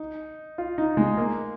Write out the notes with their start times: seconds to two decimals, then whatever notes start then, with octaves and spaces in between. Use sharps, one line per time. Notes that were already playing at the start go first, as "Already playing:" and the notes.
Already playing: D#4
0.58 F4
0.78 D#4
0.97 G#3
1.18 A#3